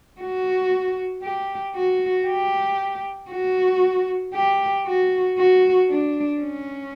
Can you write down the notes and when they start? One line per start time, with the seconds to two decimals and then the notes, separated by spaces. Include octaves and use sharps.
0.21 F#4
1.23 G4
1.76 F#4
2.27 G4
3.31 F#4
4.34 G4
4.87 F#4
5.38 F#4
5.90 D4
6.41 C#4